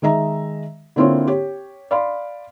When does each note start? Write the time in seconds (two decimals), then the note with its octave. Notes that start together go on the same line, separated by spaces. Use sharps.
0.02 D#3 G#3 D#5 E5 A#5
0.96 D3 A#3 C4 E4 F4 C#5
1.27 G4 C#5
1.91 D5 F5 B5 C6